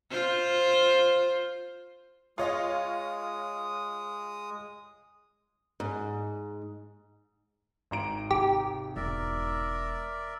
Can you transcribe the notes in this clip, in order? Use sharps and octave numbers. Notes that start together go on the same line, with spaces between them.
F4 C5
G#3 F4 C#5 D#5 D#6
G#2
G#1 A#5 D7
C3 G4
E1 A#4 D5 E5